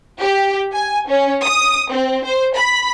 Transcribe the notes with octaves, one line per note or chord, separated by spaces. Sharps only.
G4
G#5
C#4
D#6
C4
C5
B5